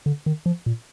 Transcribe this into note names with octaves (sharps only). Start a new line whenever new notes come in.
D3
D#3
F3
A#2